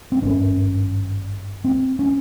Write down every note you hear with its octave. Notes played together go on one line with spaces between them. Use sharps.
C4
G#1 G2 C#4
C4
C#4